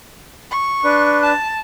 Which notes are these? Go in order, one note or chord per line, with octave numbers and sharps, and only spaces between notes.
C#6
D4 B4
A5